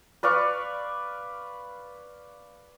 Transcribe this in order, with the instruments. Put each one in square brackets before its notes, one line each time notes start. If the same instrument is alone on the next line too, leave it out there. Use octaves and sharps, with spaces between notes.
[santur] B4 D5 F5 C#6